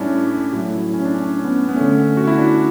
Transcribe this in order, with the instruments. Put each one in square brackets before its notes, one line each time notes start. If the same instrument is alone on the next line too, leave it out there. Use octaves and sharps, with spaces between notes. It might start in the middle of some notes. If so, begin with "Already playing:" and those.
Already playing: [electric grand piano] A2 G3 C#4 D4 E4
A2 F#3 A3 F#4
E4
C#4
D4
C#4
C#4
B3
B3
D3 A3 C#4
F#4
E4
D4